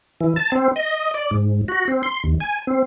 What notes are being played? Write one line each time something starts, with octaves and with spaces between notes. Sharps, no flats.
E3
A5
C4
D#5
D5
G#2
F#4
C4
C6
D#2
G#5
C4